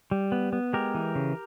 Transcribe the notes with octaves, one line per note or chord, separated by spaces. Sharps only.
G3
B3
B3
G#3 G4 A#4
E3
C#3